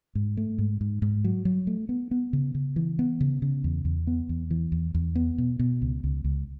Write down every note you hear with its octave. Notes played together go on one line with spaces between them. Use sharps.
G#2
A3
G#2
G#2
G#2
F#3
F#3
A3
B3
B3
C#3
C#3
E3
B3
C#3
C#3
E2
E2
B3
E2
E3
E2
E2
B3
B2
B2
C#2
C#2
C#2